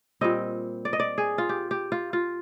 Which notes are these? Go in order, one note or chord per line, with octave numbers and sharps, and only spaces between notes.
A#2 G3 C4 D#5
D5
D#5
D5
G#4
F4
G4
G4
F4
F4